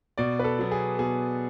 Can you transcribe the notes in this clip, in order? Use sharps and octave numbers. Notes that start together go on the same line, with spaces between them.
B2 D5
B4
A4
F#3 B3
G#4
B2 G#4